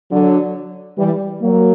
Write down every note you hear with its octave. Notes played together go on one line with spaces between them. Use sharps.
D3 F#3
E3 G3
F#3 A#3